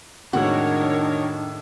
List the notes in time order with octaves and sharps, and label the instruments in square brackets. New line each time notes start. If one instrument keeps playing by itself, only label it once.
[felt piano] F2 A2 G#3 [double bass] D#3 D4 [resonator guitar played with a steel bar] F#4 [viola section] A#4 C#5